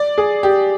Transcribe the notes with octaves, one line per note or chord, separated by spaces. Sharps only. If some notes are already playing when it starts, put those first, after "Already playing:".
Already playing: D5
G#4
G4